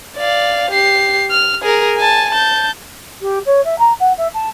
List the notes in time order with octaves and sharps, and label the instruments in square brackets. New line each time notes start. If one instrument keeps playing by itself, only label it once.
[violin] D5 F5
G4 C7
F6
G#4 A#4
G#5 A5
A5 G6
[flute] G4
C#5
E5
A#5
F#5
E5
A5